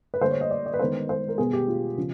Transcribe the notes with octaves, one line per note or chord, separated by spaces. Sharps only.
B4
D3 G3 A#3 C5
C#5
D#5
D5
D5
B4
D#3 G#3 B3 C5
C5
A#4
B2 G3 B3 G#4
G4
F4
C#3 F3